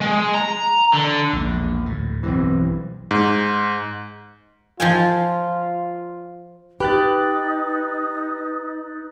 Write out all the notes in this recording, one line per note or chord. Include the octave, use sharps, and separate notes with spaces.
G#3
A#5
D3
A#1 E2 G#2
D2 A2
B1 G2 E3 C4
G#2
F3 F4 G5 G#5
D#4 G4 B4 F#6 A6